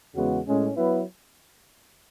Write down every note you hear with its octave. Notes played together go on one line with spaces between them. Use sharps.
E2 C#3 G#3 B3 F#4
A2 G#3 C#4
F#3 B3 E4 B4